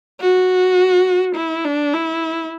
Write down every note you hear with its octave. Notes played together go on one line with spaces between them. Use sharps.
F#4
E4
D4
E4